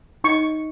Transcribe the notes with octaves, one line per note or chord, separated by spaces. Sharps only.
D#4 C#6